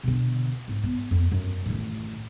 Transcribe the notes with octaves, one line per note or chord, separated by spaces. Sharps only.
B2 D3
G#2
B3
F2
F#2
A1 D#3